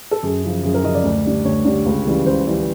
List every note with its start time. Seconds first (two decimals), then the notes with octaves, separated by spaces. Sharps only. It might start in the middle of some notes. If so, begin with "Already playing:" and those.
0.11 A4
0.23 F#2 G#4
0.43 C#3 F3
0.63 F#2 G#4
0.74 A#4
0.84 C#3 F3 D#5
0.95 D5
1.04 D2
1.25 D3 G3
1.45 D2 C#5
1.65 D3 G3
1.86 C#2
2.05 C#3 E3 G3
2.25 C#2 C5
2.46 C#3 E3 G3